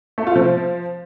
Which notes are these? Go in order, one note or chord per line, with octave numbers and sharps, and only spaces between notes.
A3
F4
F3